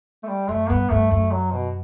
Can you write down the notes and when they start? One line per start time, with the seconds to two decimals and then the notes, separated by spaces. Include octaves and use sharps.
0.24 A3
0.28 G3
0.49 F#2 A3
0.70 G2 B3
0.90 G2 A3
1.11 F#2 A3
1.31 F#3
1.52 B2